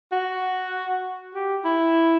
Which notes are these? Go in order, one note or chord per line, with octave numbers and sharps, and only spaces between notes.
F#4
G4
E4